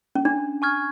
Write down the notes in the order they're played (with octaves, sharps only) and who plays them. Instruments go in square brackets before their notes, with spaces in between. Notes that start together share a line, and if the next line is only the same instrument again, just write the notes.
[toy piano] C#4
D4
[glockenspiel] G#5 C#6 F6 G#6